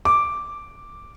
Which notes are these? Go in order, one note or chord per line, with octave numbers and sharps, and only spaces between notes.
D6